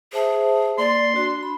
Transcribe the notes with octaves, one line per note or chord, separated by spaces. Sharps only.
G#4 C5 E5 A5
A#3 D5 C6
D4 F#4
B5